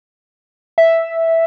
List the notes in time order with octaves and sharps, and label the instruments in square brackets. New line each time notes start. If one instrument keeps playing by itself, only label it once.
[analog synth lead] E5